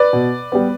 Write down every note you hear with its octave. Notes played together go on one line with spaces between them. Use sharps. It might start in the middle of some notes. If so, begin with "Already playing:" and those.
Already playing: B4 D5
B2
G3 B3